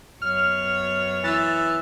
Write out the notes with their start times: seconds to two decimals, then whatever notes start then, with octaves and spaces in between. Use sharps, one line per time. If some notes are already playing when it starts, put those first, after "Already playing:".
0.22 F#2 B3 C#5 F6
1.24 E3 E6 A6